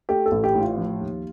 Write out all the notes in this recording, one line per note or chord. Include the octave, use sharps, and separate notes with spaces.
A3 G4
A4
A1
G4
A2
F4
F3
D#2